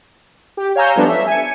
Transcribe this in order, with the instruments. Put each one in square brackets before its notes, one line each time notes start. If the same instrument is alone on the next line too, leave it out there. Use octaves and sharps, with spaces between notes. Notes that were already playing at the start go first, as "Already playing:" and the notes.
[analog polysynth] G4
C#5 F5 G#5 A#5 E6 G6
F3 G3 A3 B3 D4
E5
G#5 C#7